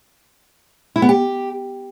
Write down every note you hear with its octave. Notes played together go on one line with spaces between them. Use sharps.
E4
B3
G4